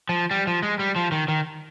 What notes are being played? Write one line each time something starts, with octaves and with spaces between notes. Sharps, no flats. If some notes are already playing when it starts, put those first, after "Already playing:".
F3
G3
F3
G#3
G3
F3
D#3
D#3